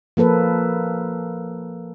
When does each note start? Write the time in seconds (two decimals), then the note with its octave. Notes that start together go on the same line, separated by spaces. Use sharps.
0.17 F3 A#3 A4 B4